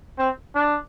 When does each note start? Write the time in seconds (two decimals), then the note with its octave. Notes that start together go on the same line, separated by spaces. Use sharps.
0.18 C4
0.55 D4